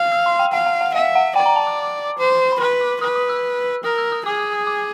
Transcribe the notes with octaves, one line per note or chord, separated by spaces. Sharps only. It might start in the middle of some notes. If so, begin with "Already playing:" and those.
Already playing: F5
E6
C6
G5
F5 F#5
F#5
F#5
E5 F5
F#5
D5 G5
A#5
A5
D6
C5
B5
B4 C6
D6
B4 D#6
D#6
E6
A#4 D#6
E6
D#6
G#4 D6
D#6
D#6
D6